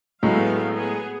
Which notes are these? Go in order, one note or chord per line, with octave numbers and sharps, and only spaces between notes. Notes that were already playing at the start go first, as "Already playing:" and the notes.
A2 F#3 G#3 A3 B3 F5
B3 G#4